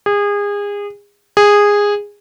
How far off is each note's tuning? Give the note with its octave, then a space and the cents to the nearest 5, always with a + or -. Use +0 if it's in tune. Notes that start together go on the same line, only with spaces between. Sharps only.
G#4 -30
G#4 -15